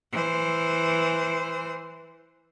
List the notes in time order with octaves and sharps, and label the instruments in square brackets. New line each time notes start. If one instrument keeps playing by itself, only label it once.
[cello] E3 C5